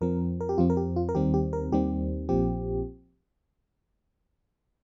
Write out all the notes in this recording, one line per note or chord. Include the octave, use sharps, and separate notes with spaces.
F2 F3 C4 A#4
A#4
G4
F2 F3 C4 F4
A#4
G4
F4
A#4
D#2 D#3 G3 C4 G4
G4
A#4
D#2 D#3 G3 C4 G4
A#1 A#2 F3 C4 G4